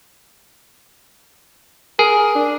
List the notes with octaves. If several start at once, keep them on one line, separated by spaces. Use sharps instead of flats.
G#4 A#4
D4